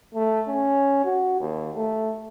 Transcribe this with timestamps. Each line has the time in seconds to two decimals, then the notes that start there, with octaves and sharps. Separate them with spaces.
0.14 A3
0.48 C#4
1.04 F#4
1.40 D#2
1.76 A3